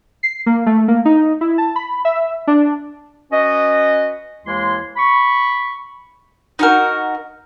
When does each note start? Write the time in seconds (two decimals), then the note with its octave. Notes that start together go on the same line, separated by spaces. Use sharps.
0.23 C7
0.46 A#3
0.66 A3
0.88 A#3
1.05 D#4
1.41 E4
1.58 A5
1.76 B5
2.05 E5
2.47 D4
3.32 C#4 F#4 B4 D#5
4.46 D#2 E3 G#3 E4 C6
4.97 B5 C#6
6.59 D#4 F#4 A#4